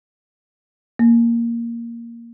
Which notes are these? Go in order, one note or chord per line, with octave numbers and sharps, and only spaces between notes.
A#3